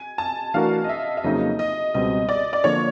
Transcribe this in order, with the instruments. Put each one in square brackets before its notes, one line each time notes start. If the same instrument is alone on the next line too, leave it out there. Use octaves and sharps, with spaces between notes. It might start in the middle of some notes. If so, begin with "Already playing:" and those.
Already playing: [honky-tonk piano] G#5
A5
[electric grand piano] E3 A3 D4 F#4 A#4 [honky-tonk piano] F5
[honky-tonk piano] D#5
E5
E5
[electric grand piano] F2 C#3 F#3 A#3 D#4 [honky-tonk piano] D#5
[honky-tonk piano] D#5
[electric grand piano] C#2 B2 G3 C4 [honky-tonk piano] D#5
[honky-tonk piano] D5
D5
[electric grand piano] D3 F3 A#3 D4 [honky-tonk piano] C#5